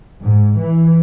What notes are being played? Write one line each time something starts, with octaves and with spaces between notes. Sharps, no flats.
G#2
E3